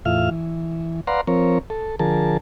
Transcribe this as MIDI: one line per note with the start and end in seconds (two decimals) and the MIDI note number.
0.05 0.30 40
0.05 0.30 45
0.05 0.30 65
0.05 0.30 76
0.05 0.30 77
0.05 0.30 89
0.31 1.01 52
1.07 1.21 71
1.07 1.21 74
1.07 1.21 77
1.07 1.21 78
1.07 1.21 82
1.07 1.21 84
1.27 1.58 53
1.27 1.58 60
1.27 1.58 70
1.27 1.58 73
1.70 1.96 69
1.99 2.37 50
1.99 2.37 53
1.99 2.37 68
1.99 2.37 70
1.99 2.37 81